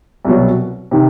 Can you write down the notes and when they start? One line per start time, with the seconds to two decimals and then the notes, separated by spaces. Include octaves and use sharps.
0.25 C2 B2 F#3
0.91 C3 D#3